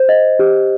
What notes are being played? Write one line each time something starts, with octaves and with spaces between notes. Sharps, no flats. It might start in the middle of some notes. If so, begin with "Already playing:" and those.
Already playing: C5
D#5
G4